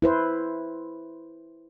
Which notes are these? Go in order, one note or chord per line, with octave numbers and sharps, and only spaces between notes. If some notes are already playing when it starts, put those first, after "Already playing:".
E4 B4 C5